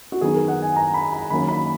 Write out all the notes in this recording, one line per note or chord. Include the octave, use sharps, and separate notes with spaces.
F#4
D#3 F#3 B3 D#4 G#4
A#4
F#5
G#5
A#5
B5
B5
D#3 F#3 A#3 C#4 B5
B5